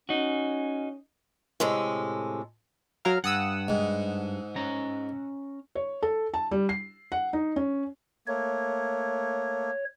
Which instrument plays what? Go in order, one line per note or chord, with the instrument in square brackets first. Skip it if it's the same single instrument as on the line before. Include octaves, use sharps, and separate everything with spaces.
[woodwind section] C#4 [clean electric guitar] D#4 F#4
[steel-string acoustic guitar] A2 C3 G#3 A4
[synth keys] F#3 A#4 F5
[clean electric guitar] G2 [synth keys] F#5 D#6 E6
[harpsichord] G#2
[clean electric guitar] C#4 A#5
[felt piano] C#5
A4
A5
G3
C7
F#5
D#4
C#4
[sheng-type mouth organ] A3 A#3 [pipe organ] C#5